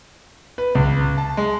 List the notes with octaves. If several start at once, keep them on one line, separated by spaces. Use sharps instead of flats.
B4
C#2
A5
G#3